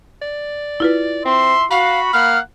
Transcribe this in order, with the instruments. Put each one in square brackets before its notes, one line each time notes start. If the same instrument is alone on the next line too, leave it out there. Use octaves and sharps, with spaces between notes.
[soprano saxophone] D5
[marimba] E4 F4 B4
[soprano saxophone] C4 [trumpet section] E5 C6
[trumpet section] F#4 [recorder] F5 [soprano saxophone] B5
[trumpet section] A#3 F5 F#5 [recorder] F6